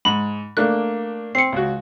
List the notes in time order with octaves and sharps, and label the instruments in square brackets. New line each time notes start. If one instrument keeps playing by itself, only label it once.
[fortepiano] G#2 [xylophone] B5
[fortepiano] A3 A#3 D4 [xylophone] F#6
[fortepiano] C4 [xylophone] C7 C#7
[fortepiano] C#2 F#4